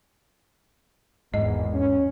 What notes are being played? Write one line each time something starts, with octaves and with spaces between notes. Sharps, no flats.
G#1 E2 G#2 D#5
C#4